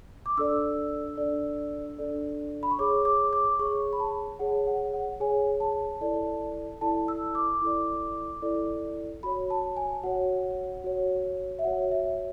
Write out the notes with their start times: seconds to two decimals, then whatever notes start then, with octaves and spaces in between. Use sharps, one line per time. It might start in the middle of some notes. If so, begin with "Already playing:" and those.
0.26 D6
0.37 D4 A4 D5 E6
1.17 D4 A4 D5
1.98 D4 A4 D5
2.63 B5
2.71 C#6
2.79 G#4 C#5 D6
3.05 D6
3.33 D6
3.59 G#4 C#5 C#6
3.93 B5
4.00 A5
4.39 G#4 C#5 F#5
4.67 F#5
4.93 F#5
5.20 G#4 C#5 G#5
5.60 A5
6.01 E4 A4 D5
6.81 E4 A4 D5 A5
7.08 E6
7.35 D6
7.62 E4 A4 D5
8.42 E4 A4 D5
9.23 F#4 C#5 B5
9.50 A5
9.77 G#5
10.03 F#4 C#5 F#5
10.84 F#4 C#5
11.59 E5
11.64 F#4 C#5 F#5
11.91 E5